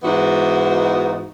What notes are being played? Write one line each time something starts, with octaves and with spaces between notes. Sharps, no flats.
G#2 E3 B3 D#4 F#4